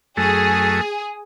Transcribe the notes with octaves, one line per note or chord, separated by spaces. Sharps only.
F#2 A3 G#4